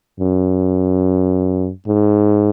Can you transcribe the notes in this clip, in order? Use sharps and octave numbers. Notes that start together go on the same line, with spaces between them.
F#2
G#2